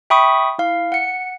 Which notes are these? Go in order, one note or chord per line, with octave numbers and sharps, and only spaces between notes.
E5 G5 B5 C#6 D#6 B6
E4 F5
F#5 C#7